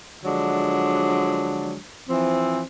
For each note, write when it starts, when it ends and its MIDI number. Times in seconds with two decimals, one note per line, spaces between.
0.24 1.76 50
0.24 1.76 53
0.24 1.76 54
0.24 1.76 56
0.24 1.76 62
2.08 2.61 52
2.08 2.61 53
2.08 2.61 60